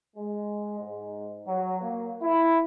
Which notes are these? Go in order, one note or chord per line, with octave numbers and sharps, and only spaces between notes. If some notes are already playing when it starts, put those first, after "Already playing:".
G#3
G#2
F#3
A#3
E4